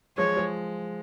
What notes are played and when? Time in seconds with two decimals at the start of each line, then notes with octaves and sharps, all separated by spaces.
0.18 F3 G#3 C#5
0.37 F3 G#3